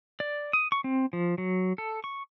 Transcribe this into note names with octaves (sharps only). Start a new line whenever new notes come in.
D5
D#6
C#6
C4
F3
F#3
A4
C#6